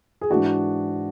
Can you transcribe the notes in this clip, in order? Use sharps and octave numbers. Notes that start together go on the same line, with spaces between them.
G#4
G#2 E3 D4 F#4